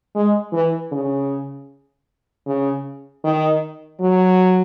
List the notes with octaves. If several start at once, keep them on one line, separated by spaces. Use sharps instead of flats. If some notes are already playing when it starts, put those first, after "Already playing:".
G#3
E3
C#3
C#3
D#3
F#3